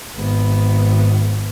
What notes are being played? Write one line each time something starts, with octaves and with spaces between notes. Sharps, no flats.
G#1 B3